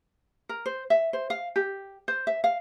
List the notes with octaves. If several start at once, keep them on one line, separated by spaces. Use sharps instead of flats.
A#4
C5
E5
C5
F5
G4
C5
E5
F5